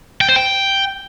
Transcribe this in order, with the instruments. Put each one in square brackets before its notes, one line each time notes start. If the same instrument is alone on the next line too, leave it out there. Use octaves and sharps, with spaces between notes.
[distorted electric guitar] G5
C5
G5